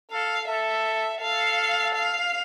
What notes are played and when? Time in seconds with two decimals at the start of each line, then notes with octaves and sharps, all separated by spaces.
0.11 A4 F5
0.48 A4 E5
1.21 A4 F5
1.95 F5